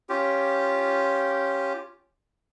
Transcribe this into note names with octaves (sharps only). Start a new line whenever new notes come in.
C#4 F4 G4